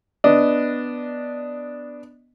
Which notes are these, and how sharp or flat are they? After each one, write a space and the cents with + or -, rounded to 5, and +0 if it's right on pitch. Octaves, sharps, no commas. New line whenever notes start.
B3 +0 D4 +0 D#5 +0